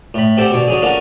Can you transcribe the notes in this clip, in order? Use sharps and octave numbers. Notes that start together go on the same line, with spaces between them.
A2 B5
C4 G4 A4 C5 F#5
B2 D3
D3 F#3 G#4
D3 A#3 C#4 F4 F#4